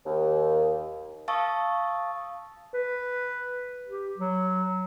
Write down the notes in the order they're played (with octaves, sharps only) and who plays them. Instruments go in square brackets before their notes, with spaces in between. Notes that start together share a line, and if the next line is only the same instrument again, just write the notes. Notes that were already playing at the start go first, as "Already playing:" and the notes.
[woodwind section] D#2
[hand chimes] F5 A5 C#6 D#6 E6 A6
[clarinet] B4
G4
F#3